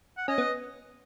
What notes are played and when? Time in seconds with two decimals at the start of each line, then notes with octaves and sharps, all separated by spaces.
0.17 F#5
0.28 C#4 D#5
0.38 B3